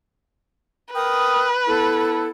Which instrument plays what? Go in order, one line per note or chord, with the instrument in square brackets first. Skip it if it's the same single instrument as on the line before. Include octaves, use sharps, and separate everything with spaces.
[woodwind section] A#4 G5 D#6 [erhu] B4
[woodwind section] B3 E4 A4